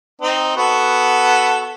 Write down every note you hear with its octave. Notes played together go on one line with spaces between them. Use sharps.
C4 D#4
B3 F#4 A4